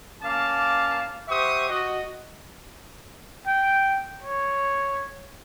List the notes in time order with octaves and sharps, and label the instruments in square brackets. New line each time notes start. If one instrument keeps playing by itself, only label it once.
[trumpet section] A#3 C#4 F5 A5 D6
G4 C5 E5 F#5 C#6 D#6
F#4 D#5
[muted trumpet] G5
C#5